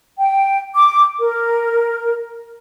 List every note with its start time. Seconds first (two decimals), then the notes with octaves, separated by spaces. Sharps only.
0.19 G5
0.75 D6
1.21 A#4